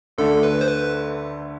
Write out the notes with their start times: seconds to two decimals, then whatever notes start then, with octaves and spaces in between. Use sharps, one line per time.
0.18 D2 D3 A3 A4
0.43 B4
0.61 C5
0.67 B4